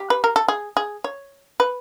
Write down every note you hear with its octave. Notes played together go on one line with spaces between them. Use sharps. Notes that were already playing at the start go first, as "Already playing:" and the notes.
Already playing: G4
B4
A#4
A4
G#4
G#4
C#5
B4